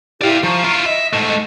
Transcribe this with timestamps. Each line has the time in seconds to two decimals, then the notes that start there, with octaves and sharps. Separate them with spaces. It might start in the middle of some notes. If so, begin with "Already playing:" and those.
0.22 E4 G4 D5 F5
0.44 F3 A#5 C#6
0.64 E4 F4
0.86 D#5 E5
1.13 G#2 A3